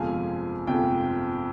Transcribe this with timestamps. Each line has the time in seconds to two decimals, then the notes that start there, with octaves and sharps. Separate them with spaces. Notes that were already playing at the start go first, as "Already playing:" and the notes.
Already playing: G1 F2 C3 F3 G#3 F5 G#5
0.67 G1 F2 C3 F3 G#3 G5